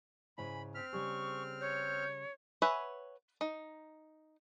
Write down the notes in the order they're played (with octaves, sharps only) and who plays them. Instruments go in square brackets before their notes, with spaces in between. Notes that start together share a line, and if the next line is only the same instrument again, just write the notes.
[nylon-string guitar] G#2 C#3 E4 [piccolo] G#5 [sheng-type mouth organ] B5
[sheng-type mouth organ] C4 F6 [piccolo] B6
[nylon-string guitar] C#3 G3 G#4 [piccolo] C#6
[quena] C#5 [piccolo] G6
[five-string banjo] B4 C#5 E5 F#5 G#5
D#4